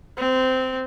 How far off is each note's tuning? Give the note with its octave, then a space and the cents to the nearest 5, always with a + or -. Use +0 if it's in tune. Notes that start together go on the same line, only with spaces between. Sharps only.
C4 -15